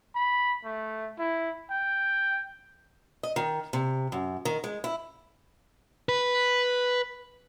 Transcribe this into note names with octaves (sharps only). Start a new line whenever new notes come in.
B5
A3
E4
G5
D#5
D#3
C3
F#2
D#3
G#3
E4
B4